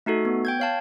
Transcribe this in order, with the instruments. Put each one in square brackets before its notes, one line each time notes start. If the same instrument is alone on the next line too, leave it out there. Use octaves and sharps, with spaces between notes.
[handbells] A3 D#4 F#4 A4
B3
G5 G6 G#6
C#5 F5 A5